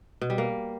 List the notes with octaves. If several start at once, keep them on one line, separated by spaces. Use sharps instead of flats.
B2
G3
A#3